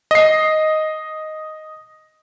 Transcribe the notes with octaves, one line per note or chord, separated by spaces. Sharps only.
D#5 C7